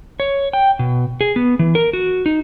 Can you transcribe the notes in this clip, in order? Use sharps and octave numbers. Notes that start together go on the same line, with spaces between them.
C#5
G5
B2
G#4
B3
E3
A#4
F#4
D#4